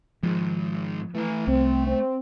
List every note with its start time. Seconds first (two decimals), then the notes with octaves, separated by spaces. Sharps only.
0.23 G#2 D#3 F3
1.15 E3 A3 A#5
1.47 C2 C4
1.87 C4